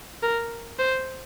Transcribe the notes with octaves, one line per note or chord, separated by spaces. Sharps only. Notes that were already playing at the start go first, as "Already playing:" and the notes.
A#4
C5